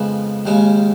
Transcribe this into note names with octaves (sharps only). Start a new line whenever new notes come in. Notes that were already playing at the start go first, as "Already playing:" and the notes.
Already playing: F2 C#3 G#3 B3
D#2 C#3 G#3 C#4